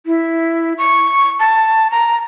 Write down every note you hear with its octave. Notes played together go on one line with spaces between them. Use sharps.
E4
C#6
A5
A#5